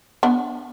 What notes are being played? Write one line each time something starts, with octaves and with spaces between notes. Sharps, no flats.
B3 D4